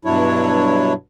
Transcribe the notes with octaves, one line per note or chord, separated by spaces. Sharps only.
G2 B2 F#3 D4 E4 C#5